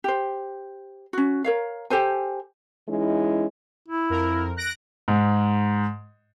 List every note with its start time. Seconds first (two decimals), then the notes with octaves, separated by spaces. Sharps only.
0.04 G4 C5
1.13 C#4 F#4
1.44 A#4 C#5 F5
1.90 G4 A4 C5 G#5
2.88 E3 G#3 C#4 D#4 E4
3.88 E4
4.10 F2 A#4
4.57 F#6 A#6 D7
5.08 G#2